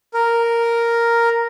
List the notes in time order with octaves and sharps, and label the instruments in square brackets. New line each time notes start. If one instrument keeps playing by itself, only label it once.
[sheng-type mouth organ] A#4